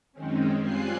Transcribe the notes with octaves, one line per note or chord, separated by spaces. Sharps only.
F#2 D#3 G#3 C4 C#4
G3 C4 F4 G#5 F#6 C7